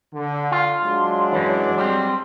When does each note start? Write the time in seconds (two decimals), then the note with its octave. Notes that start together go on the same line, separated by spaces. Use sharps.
0.14 D3
0.52 F4
0.83 F#3 G#3 D4 C6
1.32 F#2 E3 C#5
1.78 G3 C4 C6